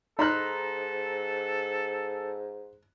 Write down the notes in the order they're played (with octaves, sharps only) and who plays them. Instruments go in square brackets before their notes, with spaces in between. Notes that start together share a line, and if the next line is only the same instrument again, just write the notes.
[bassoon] G#2 [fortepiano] D#4 [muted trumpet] A4 [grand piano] B5 C6 F#6